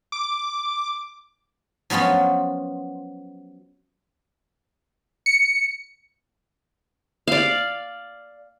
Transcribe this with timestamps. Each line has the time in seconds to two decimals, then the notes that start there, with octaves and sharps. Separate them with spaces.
0.12 D6
1.90 F3 F#3 B3 C#4 F4
5.26 C#7
7.27 D5 F5